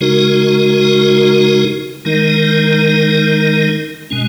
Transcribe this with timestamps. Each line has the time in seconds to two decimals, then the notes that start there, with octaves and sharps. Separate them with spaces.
0.01 C#3 G#3 D#4 F#4 A#4
2.05 D#3 G#3 D#4 A#4
4.10 B2 G#3 C#4